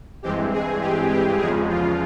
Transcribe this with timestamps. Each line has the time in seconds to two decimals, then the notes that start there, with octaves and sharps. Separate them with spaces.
0.23 G2 E3 G#3 C4 G4
0.53 G#4
0.81 G4
1.11 G4
1.39 E2 C#3 F3 G#3 G#4
1.69 F4